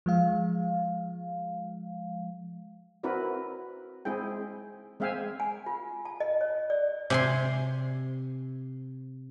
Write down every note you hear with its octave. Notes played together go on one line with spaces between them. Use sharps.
F3 G#3 F5
C4 E4 F#4 A#4 B4 D5
G#3 C4 E4 G#4 G5
G#3 C4 E5 F5 G5 G#5
G#5
F4
A5
D#5
C#5
D5
C3 G#5 C6